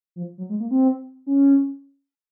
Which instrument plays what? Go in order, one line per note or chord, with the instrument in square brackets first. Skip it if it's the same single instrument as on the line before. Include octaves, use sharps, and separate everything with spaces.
[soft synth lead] F3
F#3
G#3
A#3
C4
C#4